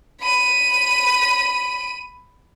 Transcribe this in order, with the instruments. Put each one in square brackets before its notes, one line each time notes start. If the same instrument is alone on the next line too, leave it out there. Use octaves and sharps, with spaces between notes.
[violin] B5 D#7